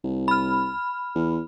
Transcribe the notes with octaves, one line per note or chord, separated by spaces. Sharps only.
C2
B5 F6
E2